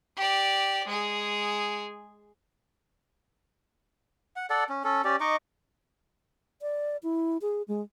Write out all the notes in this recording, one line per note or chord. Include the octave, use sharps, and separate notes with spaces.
G4 D5
G#3 G#4
F#5
A4 D5 F#5
C#4
C#4 A4
C#4 G4 D5
D#4 D#5 C#6 D6
D5
E4
G#4
G#3